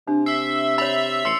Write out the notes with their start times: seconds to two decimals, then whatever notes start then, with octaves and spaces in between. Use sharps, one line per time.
0.08 C3 D4
0.26 E5 E6 C7
0.78 C#5 E5 B5 A6 F7 F#7
1.25 A1 C6 E6 C7 C#7